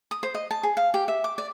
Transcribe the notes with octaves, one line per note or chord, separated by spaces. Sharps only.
D#6
C5
D#5
A5
G#4
F5
G4
E5
D6
D5